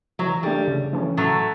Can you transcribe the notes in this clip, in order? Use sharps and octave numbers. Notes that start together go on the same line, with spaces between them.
E3 F#3
G3 A3 D4 G4
C#3
E3 A3 C#4
A2 F#3 A3